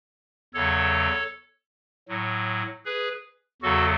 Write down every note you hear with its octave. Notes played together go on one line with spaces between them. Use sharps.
E2 C#3 F#3 A4 C#5
A2 F#3
G#4 B4
E2 C#3 F#3 F#4 A4